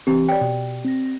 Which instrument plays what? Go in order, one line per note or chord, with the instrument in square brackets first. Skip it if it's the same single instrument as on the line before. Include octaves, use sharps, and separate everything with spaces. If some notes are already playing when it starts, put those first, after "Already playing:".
[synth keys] E3 C4 [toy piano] G4
[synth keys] C#5 [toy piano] D5 G5
[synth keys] B2
C4 A#6